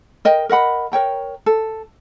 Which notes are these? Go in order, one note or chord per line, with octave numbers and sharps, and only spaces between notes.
A#4 D#5 G5
A#4 D#5 F#5 B5
A#4 C#5 G5 A#5
A4